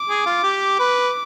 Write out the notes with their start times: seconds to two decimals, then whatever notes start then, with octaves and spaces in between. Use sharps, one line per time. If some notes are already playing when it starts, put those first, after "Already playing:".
Already playing: D6
0.09 G#4
0.26 F4
0.43 G4
0.79 B4